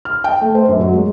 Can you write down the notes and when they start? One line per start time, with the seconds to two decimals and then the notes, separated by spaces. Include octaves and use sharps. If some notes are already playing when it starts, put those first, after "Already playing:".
0.05 F6
0.24 G5
0.41 A3
0.55 C5
0.69 F#2
0.81 F#3
0.94 G#3